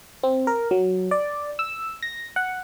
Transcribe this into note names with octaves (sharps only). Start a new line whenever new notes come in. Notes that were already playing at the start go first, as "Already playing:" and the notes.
C4
A#4
F#3
D5
E6
A#6
F#5